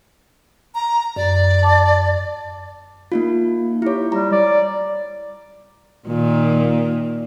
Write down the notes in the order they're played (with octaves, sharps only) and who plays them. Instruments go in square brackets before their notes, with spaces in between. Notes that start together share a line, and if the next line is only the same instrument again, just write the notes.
[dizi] A#5
[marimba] F#2 [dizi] D5
[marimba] A5 D6
[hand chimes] A#3 D#4 F4
[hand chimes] E4 C#5 [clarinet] G4
[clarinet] G3 [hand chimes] A#5
[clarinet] D5
[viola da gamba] A#2 D#3